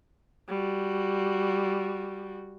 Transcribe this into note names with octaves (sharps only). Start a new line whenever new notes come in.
G3 F#4